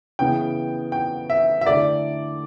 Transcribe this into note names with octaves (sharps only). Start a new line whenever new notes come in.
C#3 E3 B3 G5
G5
E5
E5
D3 A3 E4 A4 D5